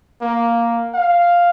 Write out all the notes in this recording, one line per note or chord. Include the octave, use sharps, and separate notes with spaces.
A#3
F5